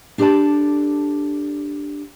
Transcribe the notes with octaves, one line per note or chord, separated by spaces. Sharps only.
D4 G4 A4 B4 D5 A5